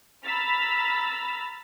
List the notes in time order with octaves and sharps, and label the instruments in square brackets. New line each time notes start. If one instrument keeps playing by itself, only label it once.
[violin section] A#5 B5 E6 F6 A6 B6